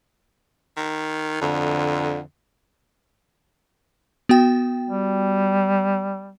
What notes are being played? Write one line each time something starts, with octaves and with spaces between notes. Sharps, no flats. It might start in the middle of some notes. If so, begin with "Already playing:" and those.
D#3
F2 D3
B3 F#4 G5
G3